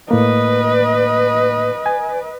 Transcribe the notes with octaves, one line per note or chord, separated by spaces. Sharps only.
A2 A#3 B4 D#5
G#5